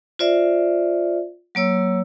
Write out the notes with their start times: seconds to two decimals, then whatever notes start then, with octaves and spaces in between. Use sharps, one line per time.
0.19 F4 C5 D5 E5
1.55 F#3 A#3 C#5 E6